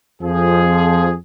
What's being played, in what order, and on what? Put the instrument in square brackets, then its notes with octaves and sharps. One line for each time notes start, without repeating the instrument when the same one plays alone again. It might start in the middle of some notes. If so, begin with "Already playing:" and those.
[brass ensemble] F2 F3 G#4